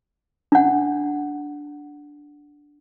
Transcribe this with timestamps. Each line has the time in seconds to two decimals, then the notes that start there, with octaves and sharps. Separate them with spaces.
0.52 D4 F#5